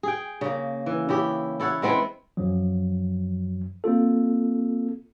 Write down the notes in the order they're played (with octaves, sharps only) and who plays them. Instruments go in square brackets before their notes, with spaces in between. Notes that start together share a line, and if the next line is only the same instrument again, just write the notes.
[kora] G#4 G5
C#3 A#3
E3
C#3 E4 G4
E4 A4 C#5 F#5
G#3 B3 C4 E4
[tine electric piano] F#2 F3 F#3
A#3 C4 F4 A4